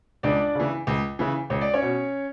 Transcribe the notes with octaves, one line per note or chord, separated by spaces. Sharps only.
C#2 D4 D5
C#3 E3
C#2
C#3 E3
C#2 C#5
D5
C#4 C#5
B2